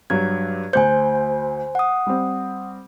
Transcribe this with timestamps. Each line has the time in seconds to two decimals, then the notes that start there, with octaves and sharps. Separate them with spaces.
0.10 G2 F#3 G#6
0.73 D2 C5 G#5 G6
1.75 F#5 D#6
2.07 G3 C4